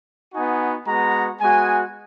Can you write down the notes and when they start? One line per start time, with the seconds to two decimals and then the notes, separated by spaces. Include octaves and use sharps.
0.33 B3 D#4 F#4 G#5
0.86 G#3 B3 F#4 A#5
1.40 G#3 B3 F#4 G#5